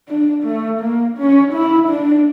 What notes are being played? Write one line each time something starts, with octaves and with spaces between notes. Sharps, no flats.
D4
A3
A#3
C#4
E4
D4